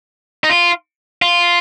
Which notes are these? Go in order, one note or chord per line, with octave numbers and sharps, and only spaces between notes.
D#4
F4
F4